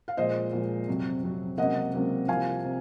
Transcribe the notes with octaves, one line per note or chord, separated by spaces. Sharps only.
F5
A#2 F3 G#3 C5 D#5
A#2 F3 G#3
F2 C3 F#3
F2 C3 F#3
C#2 C3 F#3 A#3 D#5 F#5
C#2 C3 F#3 A#3
C2 C3 F3 A#3 F5 G#5
C3